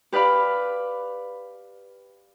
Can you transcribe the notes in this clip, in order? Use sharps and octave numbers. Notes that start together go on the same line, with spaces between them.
G4 B4 D5 F5 B5